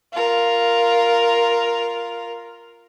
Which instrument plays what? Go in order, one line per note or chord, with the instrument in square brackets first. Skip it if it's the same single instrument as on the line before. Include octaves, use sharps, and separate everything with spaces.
[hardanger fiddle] F4 A#4